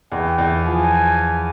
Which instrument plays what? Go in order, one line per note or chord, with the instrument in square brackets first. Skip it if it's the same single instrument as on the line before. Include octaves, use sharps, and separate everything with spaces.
[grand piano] E2 [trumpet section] G5
[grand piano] E2
[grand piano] F3 [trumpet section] G#5